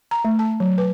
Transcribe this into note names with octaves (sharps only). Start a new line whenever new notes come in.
A#5
A3
A5
F#3
B4